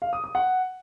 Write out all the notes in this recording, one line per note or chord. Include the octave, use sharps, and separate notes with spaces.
F5
D#6
D#6
F#5